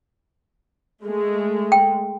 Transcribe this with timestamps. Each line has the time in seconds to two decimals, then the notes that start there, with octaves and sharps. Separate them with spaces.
1.02 G#3 A3
1.72 G5